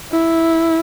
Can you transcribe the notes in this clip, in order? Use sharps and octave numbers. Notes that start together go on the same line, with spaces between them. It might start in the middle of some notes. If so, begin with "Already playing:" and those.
E4